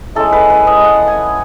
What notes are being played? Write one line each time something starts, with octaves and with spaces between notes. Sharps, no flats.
G#3 C#4 E4 A4
B4
B4
D#5
F#5
G#5